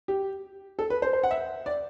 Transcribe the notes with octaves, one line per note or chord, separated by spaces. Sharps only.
G4
A4
B4
C5
C5
F#5
E5
D5